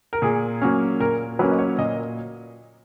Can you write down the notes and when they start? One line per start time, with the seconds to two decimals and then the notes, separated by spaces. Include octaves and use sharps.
0.13 A#4
0.22 A#2 G#4
0.61 F#3 A#3 C#4
1.00 A#2 A#4
1.39 F#3 A#3 C#4 B4
1.51 D#5
1.59 C#5
1.78 A#2 D#5